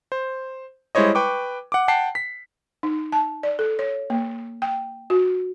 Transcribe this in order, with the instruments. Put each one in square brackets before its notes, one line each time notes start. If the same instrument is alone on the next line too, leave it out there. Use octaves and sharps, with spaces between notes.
[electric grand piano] C5
G3 G#3 E4 C5 C#5 D#5
B4 G5 C#6 D6
F#5 D6
F#5 G5 A5 C7
B6
[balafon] D#4
A5
D5
A4
C#5
A#3
G5
F#4